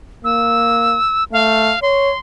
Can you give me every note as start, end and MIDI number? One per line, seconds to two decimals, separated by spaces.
0.24 0.97 58
0.24 1.24 88
1.33 1.73 57
1.33 1.79 77
1.82 2.12 73
1.82 2.19 84